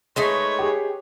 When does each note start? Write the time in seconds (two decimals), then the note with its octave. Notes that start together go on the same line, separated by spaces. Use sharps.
0.16 G#3 A3 D#4 B4 C#5 D#5 B6
0.59 G4 G#4